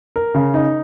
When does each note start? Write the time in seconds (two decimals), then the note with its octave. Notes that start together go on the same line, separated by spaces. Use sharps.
0.16 A#4
0.35 C#3
0.54 D#4